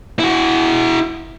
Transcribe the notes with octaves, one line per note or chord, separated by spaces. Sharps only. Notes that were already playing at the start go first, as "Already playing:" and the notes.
E4 F#4